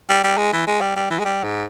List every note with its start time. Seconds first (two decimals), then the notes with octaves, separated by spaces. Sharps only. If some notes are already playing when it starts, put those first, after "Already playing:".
0.09 G3
0.24 G3
0.37 G#3
0.53 E3
0.67 G#3
0.81 G3
0.96 G3
1.11 E3
1.20 G#3
1.25 G3
1.44 G#2